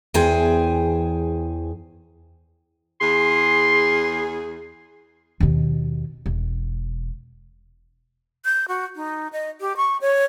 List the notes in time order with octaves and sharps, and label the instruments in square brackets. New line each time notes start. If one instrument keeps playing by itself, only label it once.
[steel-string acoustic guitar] E2 E3 G#4 C5 G5
[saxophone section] E2 G#4 [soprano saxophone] C6
[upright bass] D#2 B2
E1
[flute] G6
F#4
D#4
D#5
G4
C#6
C#5